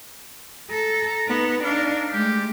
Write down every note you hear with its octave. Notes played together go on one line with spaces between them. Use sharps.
A4 A#5
B3 D#4
D4 D#4 F5
G#3 A3 G4